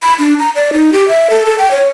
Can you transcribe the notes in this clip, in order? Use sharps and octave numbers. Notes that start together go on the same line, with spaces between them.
B5
D4
A#5
D5
D#4
G4
E5
A4
A4
G5
C#5